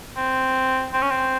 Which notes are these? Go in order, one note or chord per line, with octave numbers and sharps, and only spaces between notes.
C4
C4
C#4
C4